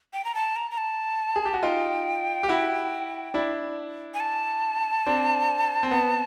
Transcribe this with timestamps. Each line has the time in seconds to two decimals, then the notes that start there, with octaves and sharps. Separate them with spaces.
0.13 G5
0.25 A#5
0.35 A5
0.56 A#5
0.71 A#5
0.78 A5
1.36 G#4
1.45 G4
1.54 F#4
1.63 D#4 F4 G5
2.43 G4
2.49 E4 F#4
3.34 D4 E4
4.14 G#5
4.20 A5
5.06 C4 D4
5.83 C4
5.91 B3